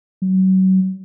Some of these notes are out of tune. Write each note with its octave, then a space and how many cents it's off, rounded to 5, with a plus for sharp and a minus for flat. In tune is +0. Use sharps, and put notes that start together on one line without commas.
F#3 +30